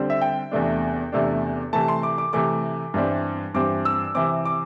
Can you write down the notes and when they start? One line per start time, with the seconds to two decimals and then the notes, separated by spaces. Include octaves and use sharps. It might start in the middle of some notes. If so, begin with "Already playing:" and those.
Already playing: D3 G3 C4
0.10 E5
0.22 G5
0.51 E2 C3 A3 D4
1.12 E2 C3 A3 D4
1.73 C3 E3 A3 A5
1.88 C6
2.03 D6
2.18 D6
2.33 C3 E3 A3 D6
2.94 G2 E3 G3 C4
3.54 G2 E3 G3 C4 D6
3.85 E6
4.15 C3 E3 C4 D6
4.45 D6